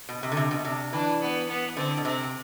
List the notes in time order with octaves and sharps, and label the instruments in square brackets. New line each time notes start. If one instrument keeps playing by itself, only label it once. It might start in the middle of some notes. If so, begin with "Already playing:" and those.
[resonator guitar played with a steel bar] B2
C3
D3
C3
B2
[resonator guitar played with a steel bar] C3 [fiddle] D4
[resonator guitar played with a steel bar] E3 [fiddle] D4
[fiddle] B3
B3
[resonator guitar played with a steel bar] D3 [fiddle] C4
[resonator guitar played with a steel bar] B2
[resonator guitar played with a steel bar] C3 [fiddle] C4